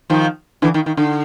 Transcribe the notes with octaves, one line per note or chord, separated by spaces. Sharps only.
D#3 F3
D3 E3
D#3
D#3
D3